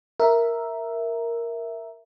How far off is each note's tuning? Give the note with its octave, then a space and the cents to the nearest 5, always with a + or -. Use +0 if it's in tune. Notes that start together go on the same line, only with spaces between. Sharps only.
A#4 +0 E5 +0